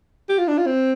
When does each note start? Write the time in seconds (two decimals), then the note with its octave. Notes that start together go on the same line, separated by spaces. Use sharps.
0.29 G4
0.38 F4
0.48 D4
0.58 F4
0.67 C4